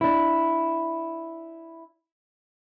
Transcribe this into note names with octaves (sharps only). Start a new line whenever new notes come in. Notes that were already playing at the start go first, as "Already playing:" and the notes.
D4 E4